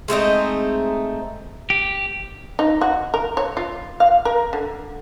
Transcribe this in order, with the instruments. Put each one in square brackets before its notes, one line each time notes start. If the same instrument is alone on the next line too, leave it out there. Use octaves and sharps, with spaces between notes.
[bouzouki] G#3 A3 C4 D#4
[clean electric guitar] G4
[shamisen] D#4
F#4
A#4
C#5
F4
F5
A#4
D3